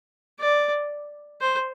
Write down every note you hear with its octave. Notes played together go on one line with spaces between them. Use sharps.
D5
C5